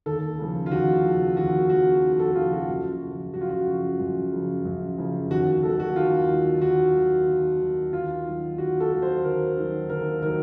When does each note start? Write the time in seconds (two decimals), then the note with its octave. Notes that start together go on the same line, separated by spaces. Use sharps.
0.06 D#2 A4
0.38 C#3 F3
0.66 F4
0.71 D#2 F#4
1.04 C#3 F3
1.37 D#2 F#4
1.70 C#3 F3 F#4
2.03 D#2
2.13 F#4
2.19 A4
2.35 C#3 F3 F4
2.52 F#4
2.69 F#2
3.01 C#3 F3
3.33 F#2 F#4
3.41 F4
3.49 F#4
3.67 C#3 F3
3.99 F#2
4.32 C#3 F3
4.65 F#2
4.98 C#3 F3
5.30 D#2 F#4
5.63 D#3 A4
5.67 F#3
5.80 F#4
5.96 D#2 F4
6.29 D#3 F#3
6.61 D#2 F#4
6.95 D#3 F#3
7.27 D#2
7.60 D#3 F#3
7.93 D#2 F4
8.26 D#3 F#3
8.58 D#2 F#4
8.80 A4
8.91 D#3 F#3
9.02 C5
9.24 D#2 A#4
9.57 D#3 F#3
9.89 D#2 A#4
10.22 D#3 F#3 A#4